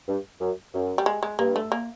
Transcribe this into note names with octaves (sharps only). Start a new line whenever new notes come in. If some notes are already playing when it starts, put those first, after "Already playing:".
G2
F#2
F#2
G3
G#3
G#3
G2 A#3
A3
A#3